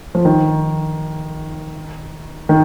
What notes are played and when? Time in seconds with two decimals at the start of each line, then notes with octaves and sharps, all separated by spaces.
0.15 F3
0.25 D#3
2.49 D#3